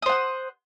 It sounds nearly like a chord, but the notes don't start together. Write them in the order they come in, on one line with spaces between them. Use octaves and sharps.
D#6 C5 F#5